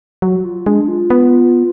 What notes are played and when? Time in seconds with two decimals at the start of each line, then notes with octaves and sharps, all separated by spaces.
0.22 F#3 F#4
0.45 F4
0.66 G#3 D4
0.88 F4
1.10 B3